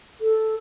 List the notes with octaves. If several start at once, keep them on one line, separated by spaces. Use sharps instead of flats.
A4